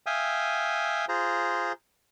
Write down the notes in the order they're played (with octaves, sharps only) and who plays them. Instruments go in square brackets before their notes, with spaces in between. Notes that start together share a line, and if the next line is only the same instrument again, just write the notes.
[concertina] E5 F5 G5 G#5 D#6
F4 G#4 C5 A#5